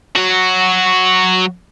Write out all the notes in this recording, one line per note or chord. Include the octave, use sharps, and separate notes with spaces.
F#3 F#4